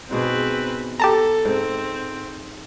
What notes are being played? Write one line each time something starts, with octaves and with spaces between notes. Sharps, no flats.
G#2 B2 C4 G#4 B4
G4 A4 A5 A#5
G#2 C4